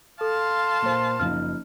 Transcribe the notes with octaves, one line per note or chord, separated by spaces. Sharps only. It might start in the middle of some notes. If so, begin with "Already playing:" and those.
A4 F5 A5 C6
A#2 C5
F#1 F3 D#4 F6